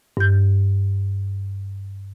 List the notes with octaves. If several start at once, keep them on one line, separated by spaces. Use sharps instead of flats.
G2 G6